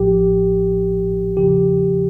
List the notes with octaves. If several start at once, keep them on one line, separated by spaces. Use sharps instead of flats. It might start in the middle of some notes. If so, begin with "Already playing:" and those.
Already playing: A1 A2 F3 G4
E2 C#3 F3 G4